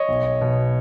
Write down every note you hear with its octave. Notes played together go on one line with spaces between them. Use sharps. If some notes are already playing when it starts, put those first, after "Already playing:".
Already playing: C#5 D#5
B1
B2